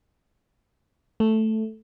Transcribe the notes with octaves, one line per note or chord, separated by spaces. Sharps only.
A3